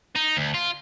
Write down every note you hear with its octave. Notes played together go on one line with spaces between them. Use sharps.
D#4
D2
F4